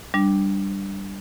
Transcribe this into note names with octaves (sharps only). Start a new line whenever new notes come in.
G3 D4